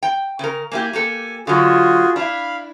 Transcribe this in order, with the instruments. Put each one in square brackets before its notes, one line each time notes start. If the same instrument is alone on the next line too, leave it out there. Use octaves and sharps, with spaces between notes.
[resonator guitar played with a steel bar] G5
C#3 A#4
[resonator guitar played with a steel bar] A#3 E4 G4 [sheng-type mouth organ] G#5
[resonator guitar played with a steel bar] A#3 G4 A4
[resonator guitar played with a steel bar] D3 F#3 [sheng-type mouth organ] F4 F#4 G#4
[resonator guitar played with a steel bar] D4 E4 [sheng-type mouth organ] F5 B5